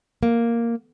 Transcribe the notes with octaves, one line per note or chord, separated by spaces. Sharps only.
A#3